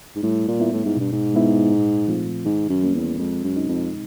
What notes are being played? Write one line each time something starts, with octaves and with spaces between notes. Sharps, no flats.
G#2
A2 G3
A#2
B3 E4
A2
G#2
G2 B2
G#2
G#3 B3 E4
A#2
F3 A3 C4 F4
G#2 D#3
F#2
G3 A#3 C#4
E2
F2 G#3
F#2
C4 D#4
F2